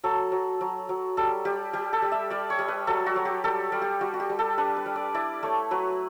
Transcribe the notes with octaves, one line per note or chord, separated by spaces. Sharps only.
F#3 A4
F#3
F#3
F#3
G3 A4
G3 G4
G3 G4
A4
G3
E5
G3 D5
C#5
G3
B4
F#3 A4
F#4
F#3
G4
G3 A4
G3
G4
G3 F#4
F#4
G4
G3
A4
D4 B4
B4
G3
D5
E4 D5
A3 C#5
F#3 B4